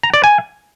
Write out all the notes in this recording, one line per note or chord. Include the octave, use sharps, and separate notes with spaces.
A#5
D5
G#5